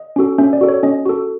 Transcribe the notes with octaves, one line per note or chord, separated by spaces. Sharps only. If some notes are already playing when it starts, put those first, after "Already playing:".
Already playing: D#5
C#4 F#4 A4
C#4 E5
D5
F#4 A4
C#5
C#4 D#5
F#4 A4